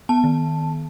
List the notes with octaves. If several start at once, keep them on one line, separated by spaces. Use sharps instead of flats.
B3 A5
D#3